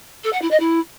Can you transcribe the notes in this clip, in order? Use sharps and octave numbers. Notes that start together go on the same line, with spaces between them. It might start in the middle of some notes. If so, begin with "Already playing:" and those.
A4
F#5
E4
D#5
E4